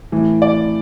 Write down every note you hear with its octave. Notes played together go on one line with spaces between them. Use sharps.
A2 E3
D5